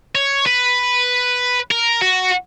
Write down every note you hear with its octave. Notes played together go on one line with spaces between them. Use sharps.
C#5
B4
A#4
F#4